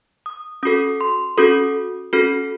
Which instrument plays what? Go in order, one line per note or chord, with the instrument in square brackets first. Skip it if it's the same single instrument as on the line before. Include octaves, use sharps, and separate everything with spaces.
[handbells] D#6
C#4 F#4 A4 D#6
C6
C#4 F#4 A4 D#6
C#4 F#4 A4 F6